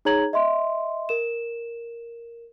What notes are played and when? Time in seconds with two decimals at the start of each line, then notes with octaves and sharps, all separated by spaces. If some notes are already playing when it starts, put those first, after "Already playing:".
0.05 D#4 G#4 C#5 A#5 G#6 F#7
0.33 D#5 E5 C6
1.09 A#4 E7